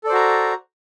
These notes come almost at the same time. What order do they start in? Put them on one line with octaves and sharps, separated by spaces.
A4 D5 C5 F#4 A#5